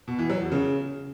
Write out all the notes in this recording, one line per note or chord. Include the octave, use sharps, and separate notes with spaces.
B2
E3
F#3
E2
C#3